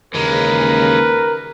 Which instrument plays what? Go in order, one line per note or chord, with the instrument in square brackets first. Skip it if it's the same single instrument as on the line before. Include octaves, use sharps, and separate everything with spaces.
[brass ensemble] D#2 C#3 [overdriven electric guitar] E3 G#3 [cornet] A#4 [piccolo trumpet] B4